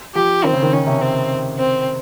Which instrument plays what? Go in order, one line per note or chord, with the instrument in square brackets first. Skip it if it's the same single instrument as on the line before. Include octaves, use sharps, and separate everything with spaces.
[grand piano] F3 [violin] G4
[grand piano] D#3 [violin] C4
[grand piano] C#3
D#3
[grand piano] D#3 [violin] C#4
[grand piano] C3
[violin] C4
C4